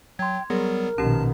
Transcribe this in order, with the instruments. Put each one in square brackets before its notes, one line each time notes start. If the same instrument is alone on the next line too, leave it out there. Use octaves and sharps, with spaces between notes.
[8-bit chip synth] F#3 [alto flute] G5 [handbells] C6 G#6
[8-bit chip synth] F#3 G3 B3 [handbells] G#4 [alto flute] A#4
[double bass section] A#1 B2 D#3 [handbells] C#4 G4 [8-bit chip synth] A5